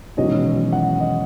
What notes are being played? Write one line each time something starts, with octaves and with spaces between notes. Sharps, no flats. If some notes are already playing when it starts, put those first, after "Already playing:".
E1 E2 D#3 F#3 C#4 D#5
F#5
D#5